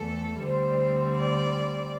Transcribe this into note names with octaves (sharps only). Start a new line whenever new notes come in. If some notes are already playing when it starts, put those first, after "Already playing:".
Already playing: E2 E3 A3 A4
D2 D3 G3 C4 C5
D5